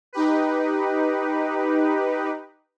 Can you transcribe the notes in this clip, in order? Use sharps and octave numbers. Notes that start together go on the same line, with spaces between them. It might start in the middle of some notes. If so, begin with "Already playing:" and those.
D#4 G4 B4